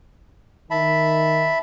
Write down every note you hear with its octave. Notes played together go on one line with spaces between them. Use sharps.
D#3 E5 A5 B5